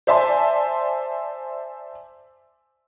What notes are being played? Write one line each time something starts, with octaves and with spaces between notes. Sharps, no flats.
C5 D5 E5 G#5 A5 C6